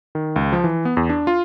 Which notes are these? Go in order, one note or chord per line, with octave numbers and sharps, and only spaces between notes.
D#3
C#2
F3
E3
B3
E2
D4
F4